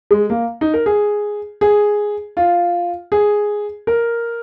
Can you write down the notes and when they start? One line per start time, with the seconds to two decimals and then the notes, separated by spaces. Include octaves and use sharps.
0.11 G#3
0.30 A#3
0.61 D#4
0.74 A#4
0.86 G#4
1.61 G#4
2.37 F4
3.12 G#4
3.87 A#4